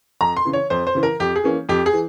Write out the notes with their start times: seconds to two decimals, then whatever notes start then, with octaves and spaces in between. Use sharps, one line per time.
0.21 F2 A#5
0.37 C6
0.45 C#3 E3
0.53 C#5
0.70 F2 C5
0.87 C5
0.95 C#3 E3
1.03 A#4
1.20 F2 G4
1.36 G#4
1.44 E3 A#3 C#4
1.69 F2 G4
1.86 G#4
1.93 E3